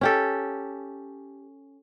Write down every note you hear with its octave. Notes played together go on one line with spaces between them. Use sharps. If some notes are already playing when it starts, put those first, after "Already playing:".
C#4 G4 A4